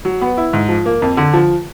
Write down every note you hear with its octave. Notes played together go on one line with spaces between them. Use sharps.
F#3
B3
E4
G#2
F3
A#3
F2
D3
F3